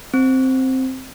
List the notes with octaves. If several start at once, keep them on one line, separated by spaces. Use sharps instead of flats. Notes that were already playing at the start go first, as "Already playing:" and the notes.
C4